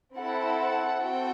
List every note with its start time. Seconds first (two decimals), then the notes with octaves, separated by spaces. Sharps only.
0.16 C4 E4 A4 F#5
0.58 F#5
1.00 C4 F#4 A4 G5